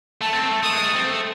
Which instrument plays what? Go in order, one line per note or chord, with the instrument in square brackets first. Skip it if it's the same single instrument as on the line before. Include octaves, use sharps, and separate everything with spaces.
[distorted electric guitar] A3 [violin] A5
[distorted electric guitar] C4
A3
[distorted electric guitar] A3 [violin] D#6
[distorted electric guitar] G#3
A3
C4
A3